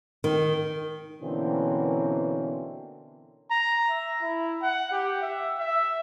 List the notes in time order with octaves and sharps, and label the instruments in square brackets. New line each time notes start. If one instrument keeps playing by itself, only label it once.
[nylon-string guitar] D#3
[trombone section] B2 D3 E3 A#3 C4 C#4
[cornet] A#5
E5
E4
F#5
G4
E5
E5